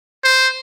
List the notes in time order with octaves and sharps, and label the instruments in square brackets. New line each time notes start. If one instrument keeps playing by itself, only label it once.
[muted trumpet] C5